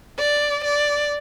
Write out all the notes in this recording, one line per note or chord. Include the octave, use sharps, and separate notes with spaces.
D5
D5